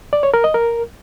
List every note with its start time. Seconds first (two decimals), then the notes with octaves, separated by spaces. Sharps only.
0.13 D5
0.23 C#5
0.34 A#4
0.44 D#5
0.54 A#4